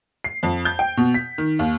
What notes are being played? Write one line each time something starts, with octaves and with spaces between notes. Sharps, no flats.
C7
F2
G6
G5
B2
B6
D#3
D#2